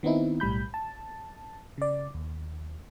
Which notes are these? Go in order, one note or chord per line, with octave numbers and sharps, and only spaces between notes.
D#3 B3 C4 D#4 E4
B1 A2 G3 B5 G6
A5
C#3 D5
D#2